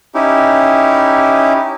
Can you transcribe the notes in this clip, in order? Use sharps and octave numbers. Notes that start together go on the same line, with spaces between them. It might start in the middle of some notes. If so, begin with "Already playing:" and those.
C#4 D#4 E4 G4